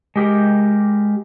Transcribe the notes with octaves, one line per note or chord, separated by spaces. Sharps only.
G#3 G4 A#4